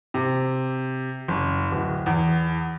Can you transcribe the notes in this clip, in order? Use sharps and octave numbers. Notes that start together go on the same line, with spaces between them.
C3
F#1
D1
E2